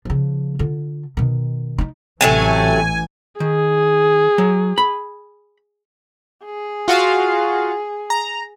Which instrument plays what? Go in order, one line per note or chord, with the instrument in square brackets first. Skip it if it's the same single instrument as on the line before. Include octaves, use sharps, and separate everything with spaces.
[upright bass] C#3 F3
D3 F4
B2 D#3
D#4 E4
[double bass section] A1 E3 [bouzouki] C3 F#3 A3 [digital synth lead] G#5
[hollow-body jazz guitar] D#3 [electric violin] G#4
[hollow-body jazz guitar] F#3
B5
[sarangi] G#4
[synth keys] F4 F#4 F5
A#5